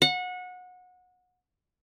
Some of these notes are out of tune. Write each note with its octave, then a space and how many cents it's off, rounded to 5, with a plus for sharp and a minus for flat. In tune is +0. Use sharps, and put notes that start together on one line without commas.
F#5 -25